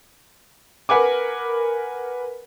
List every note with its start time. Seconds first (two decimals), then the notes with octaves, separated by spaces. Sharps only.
0.89 A#4 B4 F#5 G#5 D6